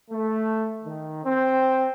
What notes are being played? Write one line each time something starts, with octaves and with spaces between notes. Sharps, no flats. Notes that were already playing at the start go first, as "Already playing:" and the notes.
A3
D#3
C4